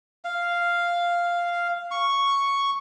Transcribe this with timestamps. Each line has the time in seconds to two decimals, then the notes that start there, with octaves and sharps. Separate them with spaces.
0.25 F5
1.91 C#6